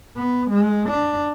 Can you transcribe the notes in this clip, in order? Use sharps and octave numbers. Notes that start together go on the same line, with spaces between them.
B3
G#3
D4